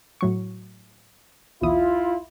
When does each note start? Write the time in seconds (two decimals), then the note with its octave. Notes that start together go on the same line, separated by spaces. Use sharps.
0.21 A2 F#3 C#6
1.62 B1 E2 E4 F4 D#6